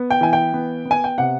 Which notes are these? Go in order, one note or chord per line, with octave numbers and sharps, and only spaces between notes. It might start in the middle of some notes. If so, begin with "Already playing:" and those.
Already playing: B3
G5
E3 G#5
G5
B3
B3
G#5
G5
C3 F#5